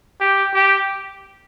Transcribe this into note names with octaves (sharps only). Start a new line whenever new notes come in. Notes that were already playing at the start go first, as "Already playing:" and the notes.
G4
G4